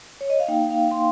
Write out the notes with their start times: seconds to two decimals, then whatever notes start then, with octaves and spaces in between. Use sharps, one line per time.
0.21 C#5
0.30 D#5
0.40 F5
0.48 A#3 D#4 G5
0.60 F5
0.71 F5
0.91 C6